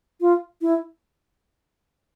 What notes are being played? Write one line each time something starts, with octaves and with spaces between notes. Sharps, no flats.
F4
E4